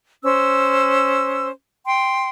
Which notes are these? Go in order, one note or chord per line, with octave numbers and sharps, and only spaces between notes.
C#4 C5 E6
G5 C6